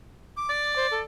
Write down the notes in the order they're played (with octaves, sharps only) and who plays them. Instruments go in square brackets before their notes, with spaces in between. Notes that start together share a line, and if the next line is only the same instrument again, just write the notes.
[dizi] D6
[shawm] D5
[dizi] C5
A4